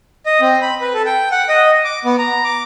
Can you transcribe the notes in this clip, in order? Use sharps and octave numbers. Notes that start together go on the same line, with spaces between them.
D#5
C4
B5
B4
A4
G5
F#5
D#5
D6
B3
A#5
D6